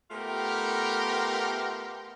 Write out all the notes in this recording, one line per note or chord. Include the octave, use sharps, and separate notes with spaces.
A3 B3 F4 G4 A#4